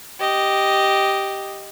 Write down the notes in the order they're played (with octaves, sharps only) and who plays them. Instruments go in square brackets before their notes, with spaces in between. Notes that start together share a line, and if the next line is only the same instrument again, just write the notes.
[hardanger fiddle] G4 D#5